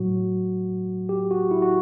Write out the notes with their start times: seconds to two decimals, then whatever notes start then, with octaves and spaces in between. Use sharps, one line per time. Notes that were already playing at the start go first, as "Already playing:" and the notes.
Already playing: A2 F#3 F#4
1.09 G4
1.31 F#4
1.51 E4
1.62 F#4